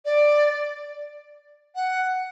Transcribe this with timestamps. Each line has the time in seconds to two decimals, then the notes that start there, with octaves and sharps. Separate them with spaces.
0.05 D5
1.75 F#5